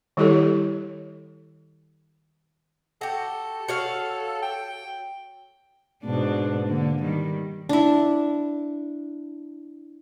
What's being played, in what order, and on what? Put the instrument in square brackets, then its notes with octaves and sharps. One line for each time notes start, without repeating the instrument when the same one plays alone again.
[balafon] D#3 G3 E4 G4 A4 C#5
[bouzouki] F#4 G4 [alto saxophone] A4
[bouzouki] F#4 C#5 F5
[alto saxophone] G5
[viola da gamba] G#2 B2 D4
D3 A#3
D#3 G3
[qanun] D4 E4